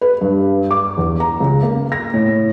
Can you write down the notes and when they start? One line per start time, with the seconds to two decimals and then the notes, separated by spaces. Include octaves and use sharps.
0.01 B4
0.21 G2
0.71 D6
0.97 E2
1.20 A#5
1.40 C#2
1.63 A#3
1.92 A#6
2.14 A2